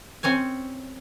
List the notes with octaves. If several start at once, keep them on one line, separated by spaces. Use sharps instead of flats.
C4 C#4 C#5 G#5